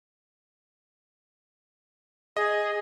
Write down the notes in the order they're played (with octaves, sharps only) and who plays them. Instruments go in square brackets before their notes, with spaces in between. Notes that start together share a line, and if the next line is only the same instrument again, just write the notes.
[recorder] G#4 [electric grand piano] D#5